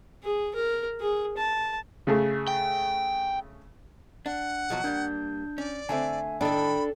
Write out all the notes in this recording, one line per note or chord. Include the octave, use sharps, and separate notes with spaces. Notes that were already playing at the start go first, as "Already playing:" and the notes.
G#4
A#4
G#4
A5
C#3 A3 G#4
G5
D4 F#5
B2 F3 F#3
G3 A#3 D4 G6
C#4 D5
D3 A3 C4 E5 G#5
A2 D#3 D4 A4 G5 B5